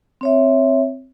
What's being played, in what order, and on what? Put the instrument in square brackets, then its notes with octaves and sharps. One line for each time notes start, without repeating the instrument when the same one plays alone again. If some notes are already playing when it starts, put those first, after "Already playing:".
[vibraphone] C4 C#5 E5